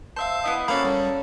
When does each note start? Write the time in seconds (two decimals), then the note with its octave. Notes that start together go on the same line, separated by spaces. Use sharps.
0.16 C5 E5 F5 A5 E6
0.44 B3 E4 D#5
0.68 A#3 C#4 F#4 A4 C5 F5 A#5 B5
0.85 G3 A4